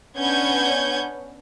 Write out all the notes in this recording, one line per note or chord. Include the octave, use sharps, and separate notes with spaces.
B3 C#4 D4 F#5 G6 G#6